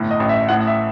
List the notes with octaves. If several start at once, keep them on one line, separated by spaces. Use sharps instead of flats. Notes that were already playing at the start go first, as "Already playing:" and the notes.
Already playing: G1 A2
D#5
A1
E5
A2 F#5
E5